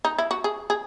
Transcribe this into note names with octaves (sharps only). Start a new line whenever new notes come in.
D#4
E4
F#4
G#4
G#4